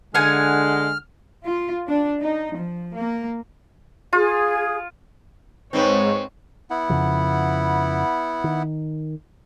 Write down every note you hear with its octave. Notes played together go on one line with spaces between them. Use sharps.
D3 G#3 F5 F#5 G#5 F6
F4
D4
D#4
F3
A#3
F4 G#4
G#2 C4 B4 C#5
B3 E4 F#5
F2 C#3 F3
D#3